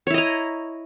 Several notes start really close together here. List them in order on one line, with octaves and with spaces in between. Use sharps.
C#5 E4 D#5 A#5